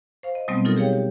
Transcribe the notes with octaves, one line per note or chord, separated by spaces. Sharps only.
C5 F5
D#5
B2 F#3 G3 A3 B3 C4
D#4 F4 A4 A#4
G4 G#4 C#5 F5 G5
G4